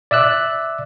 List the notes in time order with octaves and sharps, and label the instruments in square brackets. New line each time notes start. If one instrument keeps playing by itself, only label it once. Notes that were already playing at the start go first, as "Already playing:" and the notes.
[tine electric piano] D5 E5 E6 F#6